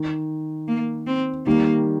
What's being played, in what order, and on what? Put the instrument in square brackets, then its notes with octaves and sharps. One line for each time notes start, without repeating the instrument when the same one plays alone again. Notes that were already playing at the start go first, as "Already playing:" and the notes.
Already playing: [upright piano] D#3
[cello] A#3
C4
[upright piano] D#3 G3 [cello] A#3